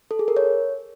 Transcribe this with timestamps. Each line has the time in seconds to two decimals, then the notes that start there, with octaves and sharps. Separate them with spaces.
0.11 A4
0.19 G#4
0.28 A#4
0.37 C#5